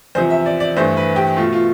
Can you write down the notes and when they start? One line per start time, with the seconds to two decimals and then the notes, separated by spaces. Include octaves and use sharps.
0.15 E2 C3 F3 C5
0.30 E5
0.46 D5
0.60 D5
0.76 G2 E3 A3 C5
0.97 B4
1.16 G4
1.37 A3 F4
1.40 B2
1.53 F4